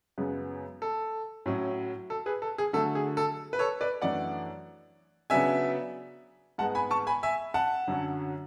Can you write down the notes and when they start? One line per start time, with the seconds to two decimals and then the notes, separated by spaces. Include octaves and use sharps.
0.18 F#2 C#3 G#3 B3
0.82 A4
1.46 A2 F#3 C#4
2.10 A4
2.26 G#4 B4
2.42 A4
2.58 G#4
2.73 D3 F#3 A3 A4
2.95 G#4
3.17 A4
3.53 B4
3.59 A4 C#5
3.81 B4 D5
4.02 F#2 E3 A3 D4 D5 F#5
5.30 C#3 F#3 B3 D4 E5 G#5
6.58 G#2 G#3 B3 F#5 A5
6.75 G#5 B5
6.91 A5 C#6
7.07 G#5 B5
7.23 E5 G#5
7.54 F#5 A5
7.87 F#2 D3 F#3 C#4